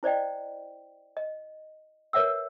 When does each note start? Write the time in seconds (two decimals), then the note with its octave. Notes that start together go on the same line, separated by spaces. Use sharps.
0.03 E4 C5 D5 D#5 G5
1.17 D#5
2.13 A#4 B4 C#5 E5 F#5 E6